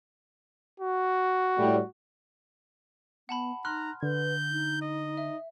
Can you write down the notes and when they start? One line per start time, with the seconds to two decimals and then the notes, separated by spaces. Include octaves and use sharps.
0.80 F#4
1.59 A2 G3
3.29 B3 F#5 A5 B5
3.65 D#4 A#5 C6 F6 F#6
4.03 D3 B4 G6
4.51 D#4
4.82 D#5
5.17 E5